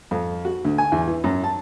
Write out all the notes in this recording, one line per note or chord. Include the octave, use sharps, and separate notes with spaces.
F2
F#4
D2
G#5
E2
E3
F#2
A5